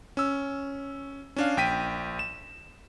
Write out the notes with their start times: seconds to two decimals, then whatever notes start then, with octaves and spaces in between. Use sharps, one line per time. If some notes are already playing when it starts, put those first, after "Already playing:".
0.17 C#4 E6
1.36 C#4 D4 F5
1.57 A#1 G5 B6 D#7
2.19 E7